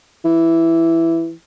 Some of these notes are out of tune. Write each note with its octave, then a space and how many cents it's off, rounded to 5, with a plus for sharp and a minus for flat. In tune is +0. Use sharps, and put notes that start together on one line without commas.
E3 +5